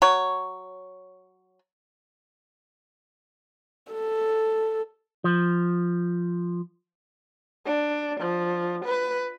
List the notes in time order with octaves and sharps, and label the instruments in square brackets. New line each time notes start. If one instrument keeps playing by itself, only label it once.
[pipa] F#3 C#5
[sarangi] A4
[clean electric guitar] F3
[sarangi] D4
F3
B4